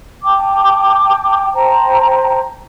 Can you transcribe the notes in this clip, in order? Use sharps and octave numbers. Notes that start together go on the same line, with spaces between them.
G5 A5 D6
C5 G5 A5 A#5